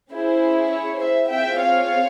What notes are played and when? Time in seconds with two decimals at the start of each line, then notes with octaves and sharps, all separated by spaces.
0.11 C#4 E4 G#4 C5
0.71 C#5
1.00 C5 E5
1.30 C4 F4 G#4 E5 G5
1.60 C#5 F5